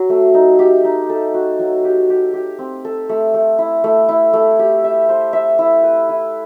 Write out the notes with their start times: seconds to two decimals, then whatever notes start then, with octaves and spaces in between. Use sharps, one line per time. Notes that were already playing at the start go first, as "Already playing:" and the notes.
Already playing: F#3
0.09 A3
0.34 D#4
0.59 G4
0.84 D#4
1.09 A4
1.34 F#4
1.59 F#3
1.84 G4
2.10 G4
2.34 G4
2.59 C4
2.85 A4
3.09 A3
3.34 A3
3.58 E4
3.84 A3
4.09 E4
4.33 A3
4.59 G4
4.84 E5
5.09 C5
5.33 E5
5.59 E4
5.84 B4
6.09 E4